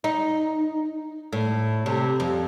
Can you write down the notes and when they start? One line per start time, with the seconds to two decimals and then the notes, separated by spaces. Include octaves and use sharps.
0.04 D#4
1.33 A2
1.86 C3
2.20 F2